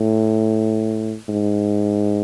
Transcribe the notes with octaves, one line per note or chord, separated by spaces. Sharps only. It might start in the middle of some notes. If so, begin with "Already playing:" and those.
Already playing: A2
G#2